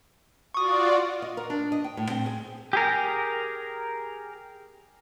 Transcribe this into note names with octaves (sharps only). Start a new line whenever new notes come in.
F4 F#4 D5 C#6 D#6
D#5
A#4
D4
D#5
G5
A2
C4
G#4
G4 G#4 A#4